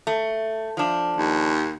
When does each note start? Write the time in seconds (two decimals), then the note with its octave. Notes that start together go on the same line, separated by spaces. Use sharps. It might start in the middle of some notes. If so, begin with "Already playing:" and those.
0.07 A3
0.77 F3 D4
1.17 D#2